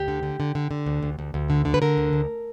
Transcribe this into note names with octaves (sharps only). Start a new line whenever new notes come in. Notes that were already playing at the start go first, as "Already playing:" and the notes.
Already playing: D2 G4
D3
D3
D3
D3
D3
D2
D2
D2
D2
D3
D3
B4
D3 A#4
D2
D2